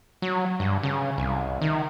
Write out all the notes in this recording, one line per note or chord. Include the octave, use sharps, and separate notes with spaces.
F#3
G2
C#3
C2
D#3